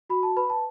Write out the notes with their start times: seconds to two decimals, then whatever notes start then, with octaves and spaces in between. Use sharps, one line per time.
0.10 F#4 B5
0.23 A5
0.36 B4 B5
0.50 A5